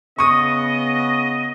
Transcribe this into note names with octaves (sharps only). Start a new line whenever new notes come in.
C#3 B3 D#5 C#6 D#6